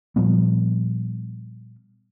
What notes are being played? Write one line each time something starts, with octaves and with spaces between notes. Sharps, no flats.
A#2 F3 G3 B3